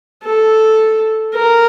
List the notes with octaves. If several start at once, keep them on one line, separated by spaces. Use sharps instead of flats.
A4
A#4